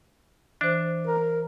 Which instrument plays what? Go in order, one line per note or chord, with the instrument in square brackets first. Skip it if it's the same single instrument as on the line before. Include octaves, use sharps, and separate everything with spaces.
[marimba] E3 C5 [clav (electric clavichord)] D4
[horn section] A#4